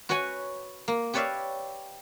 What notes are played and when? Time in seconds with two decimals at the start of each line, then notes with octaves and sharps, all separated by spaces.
0.09 F#4 B4 C#5 F#5 G#5
0.88 A#3
1.14 G4 B4 C#5 D5 E5 F5